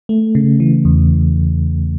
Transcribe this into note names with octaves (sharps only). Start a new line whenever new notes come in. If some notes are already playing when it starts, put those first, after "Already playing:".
A3
C#3
E3
E2